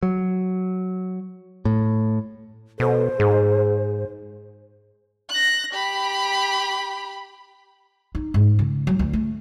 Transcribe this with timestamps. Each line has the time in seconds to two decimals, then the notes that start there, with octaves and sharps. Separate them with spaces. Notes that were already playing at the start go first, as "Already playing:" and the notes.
0.03 F#3
1.65 A2
2.80 B2 A4 C5
3.20 G#2 G#4
5.30 F#6 A#6
5.74 G4 B5
8.15 D#4
8.34 G#2
8.59 C#3
8.87 F#3
8.99 D2
9.13 A3